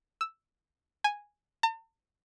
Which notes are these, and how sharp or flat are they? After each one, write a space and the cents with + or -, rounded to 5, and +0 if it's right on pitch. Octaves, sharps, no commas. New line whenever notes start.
E6 +0
G#5 -5
A5 +45